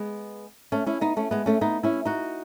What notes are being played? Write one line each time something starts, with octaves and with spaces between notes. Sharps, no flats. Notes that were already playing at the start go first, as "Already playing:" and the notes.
Already playing: G#3 B3
A3 C#4
C#4 E4
B3 D#4
A3 C#4
G#3 B3
A3 C#4
B3 D#4
C#4 E4
D#4 F#4